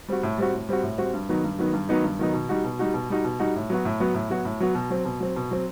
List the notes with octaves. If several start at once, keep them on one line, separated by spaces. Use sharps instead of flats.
G3 C4 F#4
A2
G3 C4 F#4
A2
G3 C4 F#4
A2
G3 C4 F#4
G2
D#3 F#3 B3 D#4
G2
D#3 F#3 B3 D#4
G2
D#3 F#3 B3 D#4
G2
D#3 F#3 B3 D#4
B2
G3 D#4 F#4
B2
G3 D#4 F#4
B2
G3 D#4 F#4
B2
G3 D#4 F#4
A2
F#3 B3 F#4
A2
F#3 B3 F#4
A2
F#3 B3 F#4
A2
F#3 B3 F#4
B2
F#3 C4
B2
F#3 C4
B2
F#3 C4